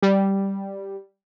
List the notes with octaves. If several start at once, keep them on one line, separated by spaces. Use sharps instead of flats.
G3